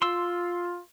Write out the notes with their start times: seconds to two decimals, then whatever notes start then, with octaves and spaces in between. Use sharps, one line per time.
0.02 F4 C6 E6